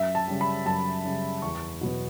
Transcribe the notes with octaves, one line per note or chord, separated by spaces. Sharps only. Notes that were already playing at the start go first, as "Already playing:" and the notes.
Already playing: F#2 E5
A5
C#3 G3
B5
F#2 A5
C#3 G3
E2 C#6
B2 F#3 B3